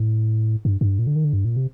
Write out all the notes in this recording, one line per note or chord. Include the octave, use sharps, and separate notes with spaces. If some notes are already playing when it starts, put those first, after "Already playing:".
Already playing: A2
G2
G2
A#2
D3
D#3
D3
G2
A#2
C3